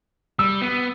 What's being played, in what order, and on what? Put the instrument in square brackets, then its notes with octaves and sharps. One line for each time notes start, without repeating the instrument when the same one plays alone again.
[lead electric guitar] G3 [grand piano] E6
[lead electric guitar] B3